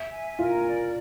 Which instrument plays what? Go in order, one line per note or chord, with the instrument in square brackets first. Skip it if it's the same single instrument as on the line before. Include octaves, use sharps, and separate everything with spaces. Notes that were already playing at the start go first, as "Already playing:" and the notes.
Already playing: [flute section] E5
G#5
[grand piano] F4 [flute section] A#4
[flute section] D5